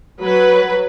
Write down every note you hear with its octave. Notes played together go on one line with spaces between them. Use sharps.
F#3 B4